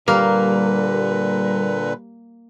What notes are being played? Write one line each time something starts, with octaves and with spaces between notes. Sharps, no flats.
A#2 D3 G3 A#3 A#4 B4